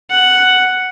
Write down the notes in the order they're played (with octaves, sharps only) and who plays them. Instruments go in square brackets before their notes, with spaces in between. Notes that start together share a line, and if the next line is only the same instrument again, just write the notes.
[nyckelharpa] F#5